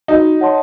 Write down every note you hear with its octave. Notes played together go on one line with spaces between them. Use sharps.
D#4 F#4
C#5 F#5 A5 C6